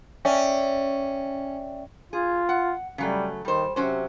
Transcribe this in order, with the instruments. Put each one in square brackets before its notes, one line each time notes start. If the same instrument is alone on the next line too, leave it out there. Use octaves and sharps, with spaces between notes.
[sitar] C#4 [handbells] D5 E5 G5
[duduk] F4 [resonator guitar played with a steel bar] G#4
[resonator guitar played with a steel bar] F#5
[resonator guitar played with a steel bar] C#3 F#3 A3 [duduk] G3
[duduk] D#3 [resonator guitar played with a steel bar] G3 C5
[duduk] C3 [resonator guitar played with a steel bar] F#3 C#4 C5